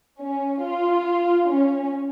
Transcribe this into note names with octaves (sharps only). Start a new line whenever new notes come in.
C#4
F4
C#4